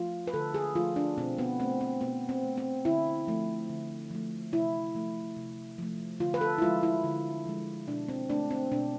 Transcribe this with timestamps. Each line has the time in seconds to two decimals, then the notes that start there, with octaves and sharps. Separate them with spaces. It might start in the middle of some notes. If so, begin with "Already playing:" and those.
Already playing: F3 A3 F4
0.27 B4
0.34 D3 A4
0.54 G#4
0.75 F3 A3 F4
0.96 D4
1.17 B2 C4
1.38 B3
1.59 A3 C4
1.81 C4
2.01 B2 B3
2.29 C4
2.43 A3
2.57 C4
2.85 D3 E4
3.27 F3 A3
3.69 D3
4.11 F3 A3
4.53 C3 E4
4.95 F3 A3
5.36 C3
5.78 F3 A3
6.20 D3 F4
6.34 B4
6.41 A4
6.58 E4
6.62 F3 G#3 F4
6.83 E4
7.04 D3
7.46 F3 G#3
7.88 B2 D4
8.08 C4
8.30 A3 D4
8.51 C4
8.72 B2 D4